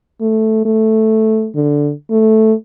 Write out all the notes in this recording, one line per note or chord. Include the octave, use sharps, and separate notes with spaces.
A3
A3
D3
A3